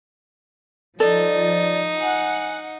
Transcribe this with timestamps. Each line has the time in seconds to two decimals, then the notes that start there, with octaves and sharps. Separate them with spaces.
1.00 F3 D#4 A4 D5
2.00 F#5 G#5